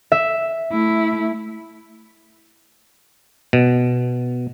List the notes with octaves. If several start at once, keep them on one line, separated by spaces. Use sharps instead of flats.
E5
A3 E4
B2